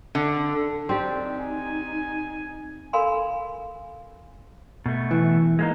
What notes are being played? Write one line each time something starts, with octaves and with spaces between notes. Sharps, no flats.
D3
C4 D4 D#4 G4
G#5
A4 A#4 F5 G#5 B5 C6
B2 A3
E3
G#3 A#3 D#4